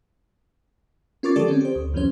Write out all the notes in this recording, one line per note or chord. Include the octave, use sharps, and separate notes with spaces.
C#4 F4 A#4 C#6 D6 A6
D3 F3 G#3 G4 A4 D5
C4 C#4
G4 C5
D2
C2 F#2 E3 F#3 C#4 C5